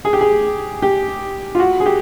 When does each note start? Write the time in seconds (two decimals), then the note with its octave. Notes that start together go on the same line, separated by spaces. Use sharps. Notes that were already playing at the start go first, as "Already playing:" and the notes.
0.05 G#4
0.13 G4
0.21 G#4
0.82 G4
1.55 F4
1.60 F#4
1.80 G#4
1.86 G4